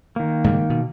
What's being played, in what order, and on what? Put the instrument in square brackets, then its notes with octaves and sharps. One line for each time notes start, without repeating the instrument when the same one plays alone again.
[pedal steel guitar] D#3 A#3
[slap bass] G#2 C#3 G3
B2